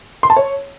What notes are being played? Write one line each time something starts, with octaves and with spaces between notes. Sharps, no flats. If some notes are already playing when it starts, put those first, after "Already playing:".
C6
A5
C#5